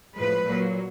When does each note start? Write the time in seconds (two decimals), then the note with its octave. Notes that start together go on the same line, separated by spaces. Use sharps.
0.16 A2 F3 G#3 B4
0.47 A#2 F#3 A#3